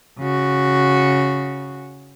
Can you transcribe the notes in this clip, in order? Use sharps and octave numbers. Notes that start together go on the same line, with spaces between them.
C#3 F#4